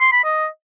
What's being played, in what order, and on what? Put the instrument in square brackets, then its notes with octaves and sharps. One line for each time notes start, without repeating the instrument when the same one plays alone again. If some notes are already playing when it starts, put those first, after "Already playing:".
[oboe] C6
B5
D#5